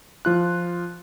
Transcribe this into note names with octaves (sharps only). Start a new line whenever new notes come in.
F3 F4 F#6